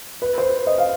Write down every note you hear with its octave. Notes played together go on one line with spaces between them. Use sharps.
B4
C5
D#5
F5